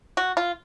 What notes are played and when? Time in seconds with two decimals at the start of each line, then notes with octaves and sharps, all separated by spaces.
0.17 F#4
0.37 F4